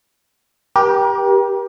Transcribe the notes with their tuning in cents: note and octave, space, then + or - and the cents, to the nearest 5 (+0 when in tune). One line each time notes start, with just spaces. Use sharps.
G4 +0 A#4 +40